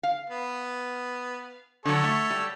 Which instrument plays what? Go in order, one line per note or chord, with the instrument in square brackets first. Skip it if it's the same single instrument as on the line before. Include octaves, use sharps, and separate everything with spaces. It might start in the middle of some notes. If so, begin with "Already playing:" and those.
[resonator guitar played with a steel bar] F5
[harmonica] B3
[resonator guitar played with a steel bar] D3 F#3 [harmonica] A4 C#5
[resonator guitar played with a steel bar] A3 E5
G3